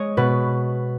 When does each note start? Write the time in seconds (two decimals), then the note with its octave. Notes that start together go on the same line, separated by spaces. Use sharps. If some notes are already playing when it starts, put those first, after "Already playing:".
Already playing: G#3 C#5 D#5
0.17 B2 B4